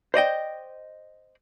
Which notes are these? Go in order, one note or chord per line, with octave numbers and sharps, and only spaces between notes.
C5 D5 D#5 G5